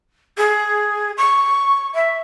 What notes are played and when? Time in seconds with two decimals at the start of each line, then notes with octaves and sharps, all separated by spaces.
0.37 G#4
1.17 C#6
1.94 E5